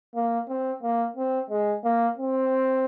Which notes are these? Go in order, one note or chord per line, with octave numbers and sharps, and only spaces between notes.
A#3
C4
A#3
C4
G#3
A#3
C4